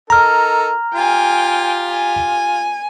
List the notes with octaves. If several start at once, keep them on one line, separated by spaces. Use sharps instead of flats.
D#4 A4 A#4 A#5 F6
F4 G4 G5 G#5
G#5